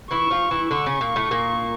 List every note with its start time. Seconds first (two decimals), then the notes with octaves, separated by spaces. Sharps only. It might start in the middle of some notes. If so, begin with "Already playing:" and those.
0.11 E3 E4 C#6
0.30 F3 F4
0.51 E3 E4
0.71 D3 D4 C#6
0.86 C#3 C#4
1.01 A#2 A#3
1.16 A2 A3
1.31 A#2 A#3